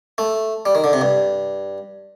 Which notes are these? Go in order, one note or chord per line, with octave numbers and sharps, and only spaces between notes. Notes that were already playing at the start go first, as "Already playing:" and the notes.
A3
G3
D#3
D3
C3
G2